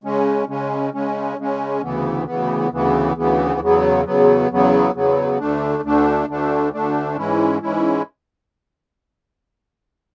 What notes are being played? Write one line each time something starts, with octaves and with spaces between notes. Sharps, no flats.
C#3 G#3 C#4
C#3 G#3 C#4
C#3 G#3 C#4
C#3 G#3 C#4
D2 C#3 E3 B3
D2 C#3 E3 B3
D2 C#3 E3 B3
D2 C#3 E3 B3
E2 C#3 F#3 B3
E2 C#3 F#3 B3
E2 C#3 F#3 B3
E2 C#3 F#3 B3
D2 D3 A3 D4
D2 D3 A3 D4
D2 D3 A3 D4
D2 D3 A3 D4
G#2 E3 G#3 C#4 E4
G#2 E3 G#3 C#4 E4